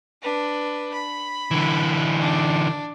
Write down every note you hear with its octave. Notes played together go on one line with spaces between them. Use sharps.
D4 B4
B5
D3 E3
D4